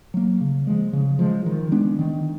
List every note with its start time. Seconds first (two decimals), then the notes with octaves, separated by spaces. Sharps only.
0.14 F#3 A#3
0.41 C#3
0.67 F3 G#3
0.93 C#3
1.19 F3 G#3
1.46 D#3
1.72 G#3 B3 D4
1.99 D#3